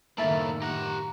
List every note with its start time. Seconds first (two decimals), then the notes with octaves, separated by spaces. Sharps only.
0.18 F#2 A2 D#3 A#3 E4 A4 E5 A5
0.62 G4 F#5 A#5